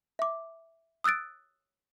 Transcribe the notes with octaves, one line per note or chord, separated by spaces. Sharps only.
E5 D6
D#6 E6 F#6 A6 D7